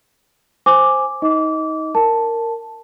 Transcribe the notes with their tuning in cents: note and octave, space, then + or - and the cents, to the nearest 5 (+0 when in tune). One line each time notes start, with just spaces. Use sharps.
C5 +0 G#5 +0 D6 +0
D#4 +25 D#5 +20 D6 -25
A#4 -15 A5 +0